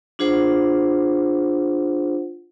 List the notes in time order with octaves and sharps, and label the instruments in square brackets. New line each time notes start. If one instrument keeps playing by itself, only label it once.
[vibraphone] D4 F4 G#4 C5 F#5